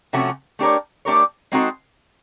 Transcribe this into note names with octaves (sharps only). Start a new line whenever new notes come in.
C3 F3 A3 C#4 F#4
A3 D4 G4 A#4 C#5
A3 D4 G4 A#4 C#5
G#3 C4 D#4 F#4 A4